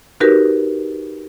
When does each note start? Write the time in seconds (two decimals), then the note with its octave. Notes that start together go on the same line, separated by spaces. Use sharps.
0.20 D#4 F#4 G4 A#4 B4